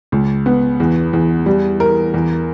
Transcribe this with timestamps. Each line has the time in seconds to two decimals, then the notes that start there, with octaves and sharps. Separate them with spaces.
0.12 C#2
0.46 B3
0.80 E2
1.13 E2
1.46 G3
1.80 A#4
2.14 E2